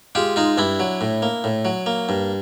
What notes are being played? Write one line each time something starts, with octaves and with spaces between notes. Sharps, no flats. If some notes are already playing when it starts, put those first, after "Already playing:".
G#3 F4 G4
G#3 D#4 F4
G2 D4 E4
F#3
A2
A#3
A2
F#3
A#3
G2